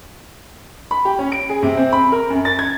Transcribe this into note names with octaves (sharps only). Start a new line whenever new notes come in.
B5
G4
C#4
D7
G#4
C3
C4
B5
A#4
F#2
A6
G#6